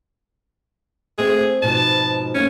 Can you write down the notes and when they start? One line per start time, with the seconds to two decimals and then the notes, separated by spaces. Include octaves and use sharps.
1.19 A3 C4 G#4
1.62 G#2 B2 F3 A5
2.35 F#2 A3 A#3 C#4